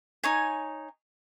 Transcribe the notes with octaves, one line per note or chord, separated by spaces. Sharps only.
D#4 C#5 G#5